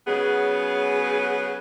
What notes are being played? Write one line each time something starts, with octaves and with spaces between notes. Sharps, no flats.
C#3 F#3 B3 G#4